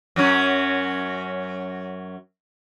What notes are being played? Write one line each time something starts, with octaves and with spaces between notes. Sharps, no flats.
F#2 F#3 C#4